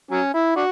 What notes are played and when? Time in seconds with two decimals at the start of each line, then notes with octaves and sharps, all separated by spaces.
0.11 F#3 C#4
0.34 E4
0.56 D4 F#4